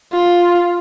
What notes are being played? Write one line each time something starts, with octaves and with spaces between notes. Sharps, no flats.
F4